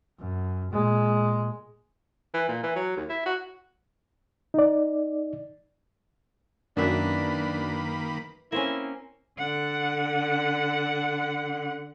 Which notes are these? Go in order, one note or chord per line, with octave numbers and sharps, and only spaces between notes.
F#2
A#2 G#3
E3
A#2
E3
F#3
D#2
E4
F#4
D#4 D5
F#2 D#3 A#3 D4 B4 E5 B5
A#3 C4 C#4 E4
D3 F#5